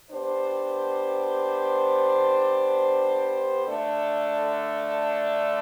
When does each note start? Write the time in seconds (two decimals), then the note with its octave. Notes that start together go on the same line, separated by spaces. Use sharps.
0.11 B3 D4 G4 C5
3.65 D3 A3 D4 A4